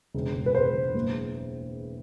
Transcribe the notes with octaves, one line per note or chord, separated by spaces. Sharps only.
E1
E1
B4
E1 C5
E1
F#1